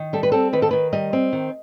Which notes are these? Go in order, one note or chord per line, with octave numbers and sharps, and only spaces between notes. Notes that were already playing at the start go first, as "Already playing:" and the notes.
Already playing: D#3
G3 A4
B4
C4 A4
D#3 B4
A4
D#3 B4
G3 D#5
C4
D#3